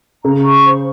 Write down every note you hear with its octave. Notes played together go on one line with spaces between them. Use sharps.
C#3 A#5
C#6
C5